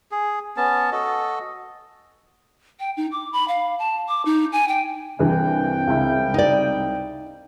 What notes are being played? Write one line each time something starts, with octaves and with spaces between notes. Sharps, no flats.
G#4
B3 C#4 A5
F#4 A4 D#5
G5
D#4
D6
B5
F5
A5
D6
D#4
G#5
G5
C2 G2 C3 E3 G5
C#2 E4
D#4 D5